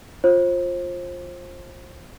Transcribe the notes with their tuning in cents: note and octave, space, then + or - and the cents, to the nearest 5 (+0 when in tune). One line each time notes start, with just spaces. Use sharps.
F4 +10 C5 +30